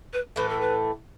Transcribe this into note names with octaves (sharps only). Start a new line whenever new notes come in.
B4
A2 E3 A3 B4
A4
B4